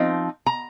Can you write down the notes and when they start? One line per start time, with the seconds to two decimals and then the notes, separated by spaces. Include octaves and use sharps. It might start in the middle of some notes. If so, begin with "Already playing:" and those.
Already playing: F3 C4 D#4
0.46 A#5